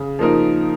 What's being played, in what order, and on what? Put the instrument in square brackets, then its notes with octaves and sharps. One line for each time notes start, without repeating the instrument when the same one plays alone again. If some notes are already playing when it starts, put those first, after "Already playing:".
Already playing: [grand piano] C#3
F3 A#3 D#4 A#4